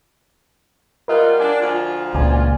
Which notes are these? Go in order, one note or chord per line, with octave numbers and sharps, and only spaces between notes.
G3 F4 A#4 D#5 F#5
D4 G#5
D2 F3 F4
C#2 A#2 D5 G#5